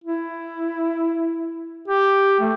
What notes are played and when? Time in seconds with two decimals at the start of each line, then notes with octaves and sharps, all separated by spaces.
0.04 E4
1.88 G4
2.40 A3